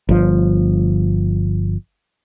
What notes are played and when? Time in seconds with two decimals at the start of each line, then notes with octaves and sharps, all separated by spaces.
0.09 G1 F3